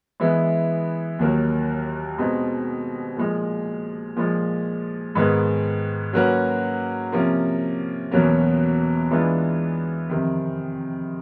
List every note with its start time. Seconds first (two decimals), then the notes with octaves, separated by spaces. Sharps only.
0.20 E3 G#3 B3 E4
1.19 D#2 D#3 F#3 A#3
2.18 B2 G#3 C4 D#4
3.17 A#2 F3 G#3
4.16 A#2 F3 G#3
5.15 G#2 D#3 G#3 B3
6.13 F#3 A#3 C#4 F#4 B4
7.12 C3 F3 A#3 C#4
8.12 E2 B2 F#3 A#3 C#4
9.11 E3 G#3 B3 D4 F4
10.10 F2 C3 D#3